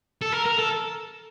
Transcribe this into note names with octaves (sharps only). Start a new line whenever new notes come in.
A4
A#4
A#4
A4